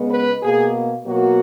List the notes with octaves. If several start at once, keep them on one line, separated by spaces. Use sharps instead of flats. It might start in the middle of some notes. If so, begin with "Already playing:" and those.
Already playing: C#3 G#3 B3
B4
B2 A#3 G#4
B2 F#3 A#3 F#4